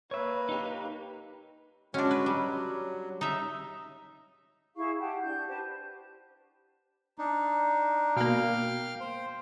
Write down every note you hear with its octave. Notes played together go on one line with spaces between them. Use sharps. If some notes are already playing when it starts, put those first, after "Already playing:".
A#3 B4 C#5 E5
D#4 G4
G#3 C#4 D4 F#4
B4
F#3 G3
D#4 E5
E4 G#4 F5 C#6
G4 F#5 A5
D4 G6
G4 B4 C5 A5
D4 D#4
B2 A#3 F5 G5 F6
C5